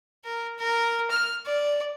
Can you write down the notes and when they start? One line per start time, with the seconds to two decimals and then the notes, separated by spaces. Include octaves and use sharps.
0.25 A#4
0.59 A#4
1.11 F6
1.46 D5